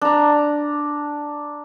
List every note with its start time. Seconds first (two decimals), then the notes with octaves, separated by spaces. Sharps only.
0.01 D4 A#5